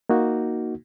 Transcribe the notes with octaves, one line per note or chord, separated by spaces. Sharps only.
A#3 D#4 F#4